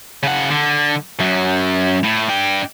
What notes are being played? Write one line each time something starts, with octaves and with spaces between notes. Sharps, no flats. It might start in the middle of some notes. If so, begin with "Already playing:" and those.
C#3 F#5
D3
F#2 F#3
A2
D4 G5